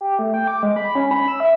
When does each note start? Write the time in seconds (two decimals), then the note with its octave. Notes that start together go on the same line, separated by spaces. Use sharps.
0.01 G4
0.19 A3
0.34 G5
0.48 D6
0.63 G#3
0.76 B5
0.95 C#4
1.11 B5
1.28 E6
1.40 E5